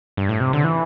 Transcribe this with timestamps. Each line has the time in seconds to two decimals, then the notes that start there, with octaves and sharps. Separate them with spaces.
0.17 G2
0.29 A2
0.40 C3
0.53 D3
0.64 E3